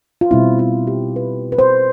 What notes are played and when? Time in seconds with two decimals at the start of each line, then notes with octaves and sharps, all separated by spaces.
0.21 F4
0.31 B2 G3 C4 E4
0.59 F4
0.87 G4
1.16 B4
1.52 B4
1.59 C5